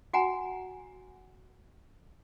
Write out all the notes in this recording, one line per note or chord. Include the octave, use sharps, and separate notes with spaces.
F#4 F#5 G#5 A#5